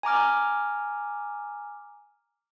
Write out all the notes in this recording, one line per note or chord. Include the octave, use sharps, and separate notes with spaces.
G#5 A#5 D6 F6